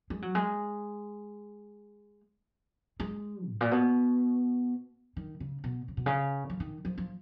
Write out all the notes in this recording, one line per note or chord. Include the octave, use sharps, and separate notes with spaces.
G#3
F#3
G#3
G#3
G#2
A#2
B2
D#3
C#3
B2
C#3
B2
C#3
F3
D#3
F3
F3